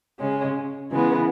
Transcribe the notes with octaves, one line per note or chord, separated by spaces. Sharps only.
C#3 G#3 C#4
C#3 E3 G#3 B3